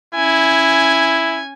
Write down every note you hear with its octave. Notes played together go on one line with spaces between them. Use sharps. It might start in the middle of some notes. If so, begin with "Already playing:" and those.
C#4 E4 G#5